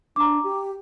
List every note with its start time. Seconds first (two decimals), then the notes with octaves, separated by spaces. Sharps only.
0.16 D4 A#5 D6
0.44 G4